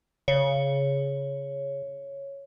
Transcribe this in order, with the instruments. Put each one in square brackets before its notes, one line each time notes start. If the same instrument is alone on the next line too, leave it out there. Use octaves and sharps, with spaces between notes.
[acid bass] C#3 [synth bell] C#5